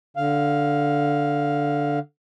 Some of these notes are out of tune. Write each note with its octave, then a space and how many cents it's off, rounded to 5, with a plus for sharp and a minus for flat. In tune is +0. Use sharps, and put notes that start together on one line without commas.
D3 +0 F5 +0